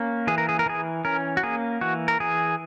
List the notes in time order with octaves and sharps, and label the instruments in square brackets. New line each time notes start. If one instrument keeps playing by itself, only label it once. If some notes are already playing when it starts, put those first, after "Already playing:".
Already playing: [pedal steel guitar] A#3 C#4
E3 G#4
A#4
G#4
A#4
E3 G#4
C#4 A#4
F#4
A#3 G#4
E3 F#4
A#4
E3 G#4